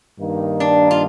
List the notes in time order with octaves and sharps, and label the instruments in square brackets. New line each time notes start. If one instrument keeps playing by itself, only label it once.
[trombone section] G2 D#3 A#3 D#4
[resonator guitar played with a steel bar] D4
F4